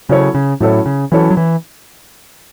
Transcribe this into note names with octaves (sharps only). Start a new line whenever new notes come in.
C#3 F#3 C#4 E4 A4 C#5
C#3
A2 F#3 C#4 E4 A4 C#5
C#3
E3 F#3 C#4 E4 A4 C#5
F#3
E3